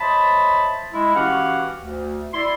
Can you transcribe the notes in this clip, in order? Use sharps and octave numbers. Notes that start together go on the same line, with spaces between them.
C5 C#5 D#5 E5 A5 B5
G#3 E4
E3 C#4 F#4 G4 F5 F#5
D2
E4 D5 C6